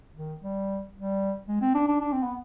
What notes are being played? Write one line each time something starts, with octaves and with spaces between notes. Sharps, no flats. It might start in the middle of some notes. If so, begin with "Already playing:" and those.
D#3
G3
G3
G#3
C4
D4
D4
D4
C4
B3